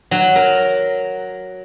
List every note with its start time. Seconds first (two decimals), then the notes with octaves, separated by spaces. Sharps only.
0.11 F#3
0.36 A#4